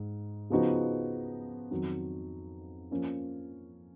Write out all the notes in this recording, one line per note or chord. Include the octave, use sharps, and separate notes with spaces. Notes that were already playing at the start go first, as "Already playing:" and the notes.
Already playing: G#2
C#3 F3 B3 D#4 F#4
F2 D#3 F#3
F3 A#3 C#4